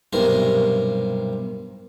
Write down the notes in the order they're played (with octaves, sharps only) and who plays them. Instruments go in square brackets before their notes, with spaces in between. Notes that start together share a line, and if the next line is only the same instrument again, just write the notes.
[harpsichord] B1 G2 C3 A#4 C5